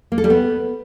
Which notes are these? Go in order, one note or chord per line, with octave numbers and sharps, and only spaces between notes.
A#3
A4
G3
B3